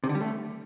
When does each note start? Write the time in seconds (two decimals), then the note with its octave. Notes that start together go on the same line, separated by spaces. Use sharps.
0.04 C3
0.09 D3
0.15 G3
0.21 A3